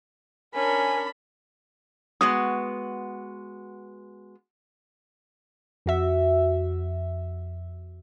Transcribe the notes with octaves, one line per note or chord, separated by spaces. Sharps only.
C#4 D4 A#4 G#5 B5
G#3 B3 F#4 D#6
F2 F#4 E5